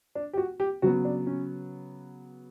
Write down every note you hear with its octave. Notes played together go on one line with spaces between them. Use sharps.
D4
G4
F#4
G4
C#3 F#3 B3 F#4
D4
C#4